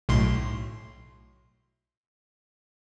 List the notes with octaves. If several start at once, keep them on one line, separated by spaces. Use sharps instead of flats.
B1 A2 C6